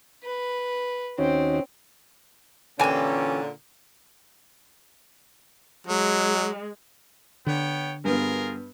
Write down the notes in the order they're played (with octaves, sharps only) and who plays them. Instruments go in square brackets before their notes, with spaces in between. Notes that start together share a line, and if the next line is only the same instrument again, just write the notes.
[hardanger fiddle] B4
[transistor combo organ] D#2 D#4 F#4 [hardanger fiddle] C4 [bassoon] C#4
[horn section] A#2 D3 [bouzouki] E3 F4 G4 [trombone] C#4 [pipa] G5 G#5
[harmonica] F#3 [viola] G#3
[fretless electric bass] D3 [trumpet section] B3 C#5 G5
[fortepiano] G2 B3 [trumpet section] F4 G#4 A#4